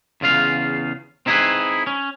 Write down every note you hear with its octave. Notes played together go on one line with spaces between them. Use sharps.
E2 C#3 F4 F5
C4 D#4 E4 G4 G#4 B4
C#4